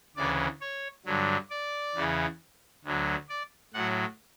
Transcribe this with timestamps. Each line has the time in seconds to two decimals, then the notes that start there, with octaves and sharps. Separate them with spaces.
0.16 D2 C#3 E3 D5
0.61 C#5
1.06 G2 D3 F#3
1.50 D5
1.95 E2 C#3 E3
2.84 D2 D3 F#3
3.29 D5
3.74 A2 F#3 F#5